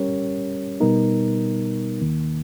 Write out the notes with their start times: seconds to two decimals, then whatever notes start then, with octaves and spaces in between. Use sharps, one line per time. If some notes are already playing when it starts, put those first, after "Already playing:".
Already playing: G3 C#4 G4 A#4 C#5
0.80 B2 G3 B3 D#4 A#4
2.01 D#2 D#3 A#3